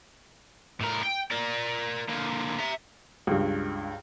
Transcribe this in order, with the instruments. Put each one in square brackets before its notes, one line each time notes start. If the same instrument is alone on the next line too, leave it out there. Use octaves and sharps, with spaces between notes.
[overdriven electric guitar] A2 A#4
G5
A#4 D5
D3 A#3
E5 A#5
[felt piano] C#2 G2